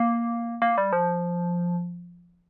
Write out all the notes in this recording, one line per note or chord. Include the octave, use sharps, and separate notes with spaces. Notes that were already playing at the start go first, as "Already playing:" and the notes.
Already playing: A#3
A#3
G3
F3